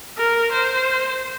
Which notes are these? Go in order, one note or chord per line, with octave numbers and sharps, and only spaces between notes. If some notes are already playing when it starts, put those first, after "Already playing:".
A#4
C5